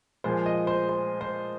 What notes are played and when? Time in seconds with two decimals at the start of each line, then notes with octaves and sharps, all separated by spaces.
0.24 A#2 F3 G#3 C5
0.46 D#5
0.67 C5
0.89 C5
1.21 C5